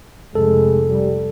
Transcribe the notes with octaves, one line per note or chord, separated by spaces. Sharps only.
F1 G#3 A4
G3